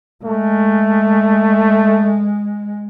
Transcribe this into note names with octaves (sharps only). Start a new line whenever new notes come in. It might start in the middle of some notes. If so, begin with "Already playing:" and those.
G#3 A3